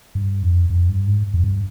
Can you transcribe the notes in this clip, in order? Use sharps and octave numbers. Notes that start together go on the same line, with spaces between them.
G2
F2
F2
G2
G#2
F2
G2